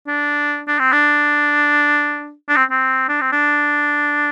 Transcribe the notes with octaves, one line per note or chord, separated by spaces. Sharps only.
D4
D4
C4
D4
D4
C4
C4
D4
C4
D4